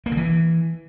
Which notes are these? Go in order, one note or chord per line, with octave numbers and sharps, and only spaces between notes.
A#3
C#3
E3